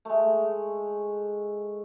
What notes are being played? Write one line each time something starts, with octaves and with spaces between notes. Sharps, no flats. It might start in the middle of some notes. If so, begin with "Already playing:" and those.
G#3 A3